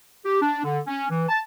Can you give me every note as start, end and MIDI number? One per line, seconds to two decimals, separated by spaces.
0.25 0.40 67
0.42 0.62 62
0.65 0.80 50
0.87 1.06 61
1.11 1.24 52
1.29 1.40 81